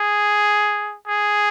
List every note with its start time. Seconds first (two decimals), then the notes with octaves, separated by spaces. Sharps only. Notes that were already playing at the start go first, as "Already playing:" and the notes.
Already playing: G#4
1.07 G#4